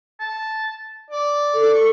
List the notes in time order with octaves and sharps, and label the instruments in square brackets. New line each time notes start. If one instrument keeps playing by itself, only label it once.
[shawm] A5
D5
[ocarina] A4
[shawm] C#6